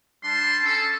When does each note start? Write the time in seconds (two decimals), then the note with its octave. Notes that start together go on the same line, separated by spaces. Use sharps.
0.24 G3 D4 A5 C6
0.64 C#4 A4